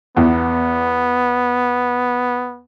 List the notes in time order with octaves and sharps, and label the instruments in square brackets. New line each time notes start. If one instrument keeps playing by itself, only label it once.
[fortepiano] E2 [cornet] B3